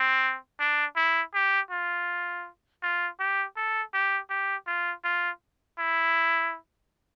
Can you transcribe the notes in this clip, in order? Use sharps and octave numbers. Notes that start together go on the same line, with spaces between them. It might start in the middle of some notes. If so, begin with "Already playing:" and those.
Already playing: C4
D4
E4
G4
F4
F4
G4
A4
G4
G4
F4
F4
E4